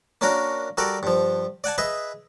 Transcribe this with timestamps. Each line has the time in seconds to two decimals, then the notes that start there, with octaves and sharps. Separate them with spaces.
0.21 A#3 C#4 D4 F#4 A#4
0.77 G3 F#4 A4 A#4 D5
1.03 G2 F3
1.64 D5 F#5 G#5 A5
1.78 G#4 B4 D#5 E5